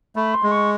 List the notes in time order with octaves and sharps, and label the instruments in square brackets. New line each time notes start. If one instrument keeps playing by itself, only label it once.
[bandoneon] A3 [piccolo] B5
[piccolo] C6
[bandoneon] G#3
[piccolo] C#6